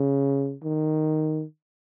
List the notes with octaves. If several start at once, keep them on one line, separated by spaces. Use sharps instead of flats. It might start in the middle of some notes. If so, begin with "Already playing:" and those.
Already playing: C#3
D#3